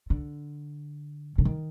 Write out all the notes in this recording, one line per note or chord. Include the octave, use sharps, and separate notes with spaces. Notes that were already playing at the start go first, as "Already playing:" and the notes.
D3
D3
D#3